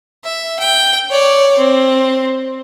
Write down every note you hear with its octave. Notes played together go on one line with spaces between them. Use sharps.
E5
G5
C#5 D5
C4